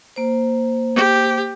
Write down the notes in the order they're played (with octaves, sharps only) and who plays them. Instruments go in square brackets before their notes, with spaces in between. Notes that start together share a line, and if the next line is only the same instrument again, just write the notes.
[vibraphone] A#3 C5
[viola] G4